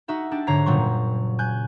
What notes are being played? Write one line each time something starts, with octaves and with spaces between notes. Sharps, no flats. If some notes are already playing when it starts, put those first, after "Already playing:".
D#4 F#4 E5 F#5
D4 G4 A5
G#2 D3 C#5 A#5 B6 C7
F#1 A#2 F#3 G3 C6 C#6
G#5 F#6 G6